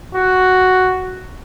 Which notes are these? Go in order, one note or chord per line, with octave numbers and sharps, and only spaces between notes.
F#4